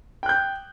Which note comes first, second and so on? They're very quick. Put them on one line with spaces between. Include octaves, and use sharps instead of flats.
G5 F#6 G6